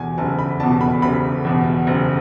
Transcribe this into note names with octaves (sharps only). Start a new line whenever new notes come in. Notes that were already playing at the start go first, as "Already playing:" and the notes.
Already playing: E2 B2 G#5
F#1 A5
B5
E2 B2 A5
B5
F#1 B5
E2 B2
F#1